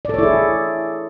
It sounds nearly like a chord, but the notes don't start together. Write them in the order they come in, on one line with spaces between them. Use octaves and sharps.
D5 A4 C#5 E4 G#4